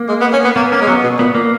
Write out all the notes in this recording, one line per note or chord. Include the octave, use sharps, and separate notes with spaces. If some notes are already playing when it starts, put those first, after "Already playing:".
Already playing: A#3
G#3
B3
C#4
B3
A#3 B3
A#3 C#4
G#3
F#3 B3
B2
A#2 B3
A#2 A#3